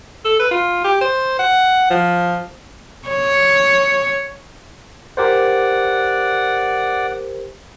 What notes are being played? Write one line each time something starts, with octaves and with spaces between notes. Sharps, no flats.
A4
B4
F4
G4
C5
F#5
F3
C#5
G4 A#4 C5 D5 F#5